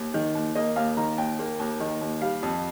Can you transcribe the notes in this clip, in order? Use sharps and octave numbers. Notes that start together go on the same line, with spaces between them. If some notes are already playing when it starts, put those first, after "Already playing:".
Already playing: D#2
D#3
D#2
A#3 D#5
D#2 F5
D#3 A#5
D#2 G5
A#3
D#2
D#3
D#2
G3 F5
F2